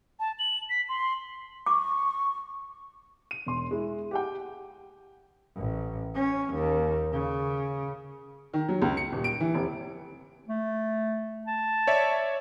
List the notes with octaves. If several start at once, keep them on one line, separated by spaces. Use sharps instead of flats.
A5
F#7
B6
C6
C#6 D6
D#7
E1 C6
G#3 E4
G4 F#5 G5
A1
C#4
D#2
C#3
D#3
F#3
C#2
C#7
D#1
D7
E3
F1
A3
A5
C#5 D5 E5